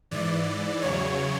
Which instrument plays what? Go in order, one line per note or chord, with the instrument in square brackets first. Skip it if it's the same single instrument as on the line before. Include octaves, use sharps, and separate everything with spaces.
[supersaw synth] G#2 E3 D5
E2 C#3 F#3 C#5